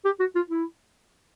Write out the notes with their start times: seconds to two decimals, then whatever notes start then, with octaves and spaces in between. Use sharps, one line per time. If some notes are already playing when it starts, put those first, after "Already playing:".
0.05 G4
0.20 F#4
0.35 F4
0.50 E4